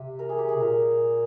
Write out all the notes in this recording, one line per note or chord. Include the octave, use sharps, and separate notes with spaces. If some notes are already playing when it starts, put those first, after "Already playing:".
Already playing: C3 G4
A#4
G#4
G4
G#4
C3
A#2 A#4